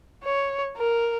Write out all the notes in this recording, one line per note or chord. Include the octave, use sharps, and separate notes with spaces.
C#5
A#4